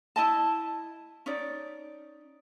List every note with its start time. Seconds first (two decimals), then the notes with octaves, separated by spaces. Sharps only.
0.16 E4 D#5 A5
1.26 C#4 D#4 D5